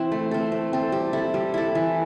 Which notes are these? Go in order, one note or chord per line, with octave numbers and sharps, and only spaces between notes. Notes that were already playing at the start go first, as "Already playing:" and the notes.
Already playing: E3 C4 E4
A3
C4 A4
A3
C4 A4
G3
E4 A4
G3
E4 A4
E3